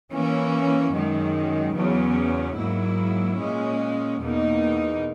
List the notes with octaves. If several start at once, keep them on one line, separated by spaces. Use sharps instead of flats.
E3 A#3 C#4
F#2 D#3 G#3
E2 C#3 F#3 C#4
G#2 F#3 A#3 E4
A#2 G#3 C#4
E2 B2 A#3 D#4